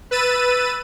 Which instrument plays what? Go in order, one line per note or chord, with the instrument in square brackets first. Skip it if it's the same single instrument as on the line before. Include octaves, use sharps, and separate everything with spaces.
[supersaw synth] B4 E6 A6 D#7